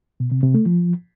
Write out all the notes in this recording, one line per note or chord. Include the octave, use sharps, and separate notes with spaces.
B2
C3
C3
A3
F3